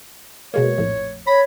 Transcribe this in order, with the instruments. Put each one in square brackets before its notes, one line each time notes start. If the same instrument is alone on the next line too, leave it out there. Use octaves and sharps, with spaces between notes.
[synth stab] B2 G#3 A#3 [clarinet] C#5
[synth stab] A#1 F2 A2
[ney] C#5 [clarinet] B5 [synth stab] A#6